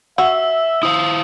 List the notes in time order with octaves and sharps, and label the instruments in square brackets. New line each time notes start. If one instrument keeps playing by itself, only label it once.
[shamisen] F#4 [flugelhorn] E5 [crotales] E6
[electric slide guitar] E4 C5 F5 [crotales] D#6